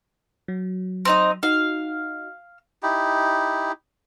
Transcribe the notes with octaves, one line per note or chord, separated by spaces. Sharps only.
F#3
C4 D#4 D#5
D#4 F#4 F5
D#4 E4 G4